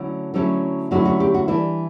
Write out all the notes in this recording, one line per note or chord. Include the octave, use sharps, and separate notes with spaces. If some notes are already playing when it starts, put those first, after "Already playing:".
Already playing: D3 F#3 A3 C#4 E4
D3 F#3 A3 C#4 E4
D3 F#3 A3 C#4 E4 F#4
F#4
G4
F#4
E3 G3 D4 E4